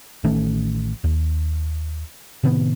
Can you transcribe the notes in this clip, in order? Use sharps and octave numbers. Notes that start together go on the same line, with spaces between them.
A1 D#3 A3 C#4
D#2
A2 C3 D#3 B3